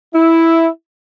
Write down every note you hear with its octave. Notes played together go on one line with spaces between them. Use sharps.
E4